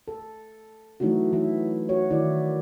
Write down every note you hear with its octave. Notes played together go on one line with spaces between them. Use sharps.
A4
E3 F#3 A3 D#4 E4 F#4
E3 E4
F#4 C#5
D#3 E4 D5